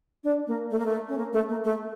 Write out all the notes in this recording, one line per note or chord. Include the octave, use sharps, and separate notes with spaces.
D4
A#3
A3
A#3
A3
C#4
A#3
A3
A#3
A3